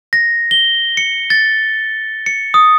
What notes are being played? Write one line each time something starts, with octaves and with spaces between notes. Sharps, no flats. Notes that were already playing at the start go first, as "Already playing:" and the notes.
A#6
G7
C#7
A6
C#7
D#6